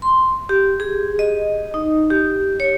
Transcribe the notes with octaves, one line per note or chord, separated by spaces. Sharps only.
C6
G4
G#4
D#5
D#4
G4
C#5